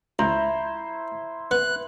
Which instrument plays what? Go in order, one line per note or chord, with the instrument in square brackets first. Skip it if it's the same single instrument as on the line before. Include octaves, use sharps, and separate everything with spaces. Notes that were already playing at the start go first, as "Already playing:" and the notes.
[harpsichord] C#2 [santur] E4 C5 [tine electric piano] A#5
[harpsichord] B3 [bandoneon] F#6